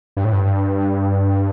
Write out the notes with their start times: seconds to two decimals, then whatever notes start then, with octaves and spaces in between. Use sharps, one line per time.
0.17 G2
0.24 A2
0.32 G2